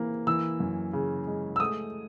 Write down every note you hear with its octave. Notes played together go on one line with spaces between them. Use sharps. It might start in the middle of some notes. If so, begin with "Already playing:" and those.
Already playing: C3 E3 A#3
E3 E6
F#2
C#3
G#3
E6
A3 D#6